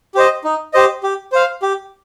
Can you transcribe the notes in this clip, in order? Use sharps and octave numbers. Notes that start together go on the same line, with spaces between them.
G4 C5 D#5
D#4
G4 C5 D#5
G4
C5 F5
G4